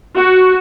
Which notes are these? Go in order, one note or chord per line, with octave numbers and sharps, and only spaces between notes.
F#4